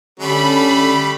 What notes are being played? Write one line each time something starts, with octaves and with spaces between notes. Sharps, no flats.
D3 G3 A3 C#4 B5